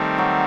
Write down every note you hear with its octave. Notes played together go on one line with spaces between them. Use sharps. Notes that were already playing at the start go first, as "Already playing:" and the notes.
Already playing: D#3 G3 A3 C4
F#3